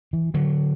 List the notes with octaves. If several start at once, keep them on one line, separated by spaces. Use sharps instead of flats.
E3
D3 F#3